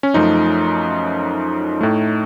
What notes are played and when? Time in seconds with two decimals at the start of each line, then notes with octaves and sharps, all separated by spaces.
0.03 C#4
0.14 F#2 F3 A3 D#4
1.81 A2 A3